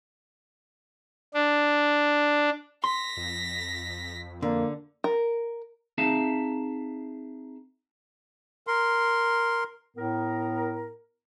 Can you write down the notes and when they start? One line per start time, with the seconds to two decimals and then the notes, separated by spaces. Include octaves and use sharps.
1.34 D4
2.84 C6 A#6 B6
3.17 F2
4.42 D3 A#3
5.04 A#4
5.98 C4 D#4 G#4 E5 F5 A5
8.67 A#4 C6
9.97 A2 B3 A#4